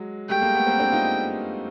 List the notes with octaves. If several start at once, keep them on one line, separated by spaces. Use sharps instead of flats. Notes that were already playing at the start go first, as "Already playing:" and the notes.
Already playing: F#3 G#3
G3 A3 G5
G#3 A#3
A3 B3
A#3 C4
C4 D4
D#4 F4